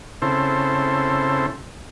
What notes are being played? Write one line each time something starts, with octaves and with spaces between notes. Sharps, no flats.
C#3 C4 E4 A4 C5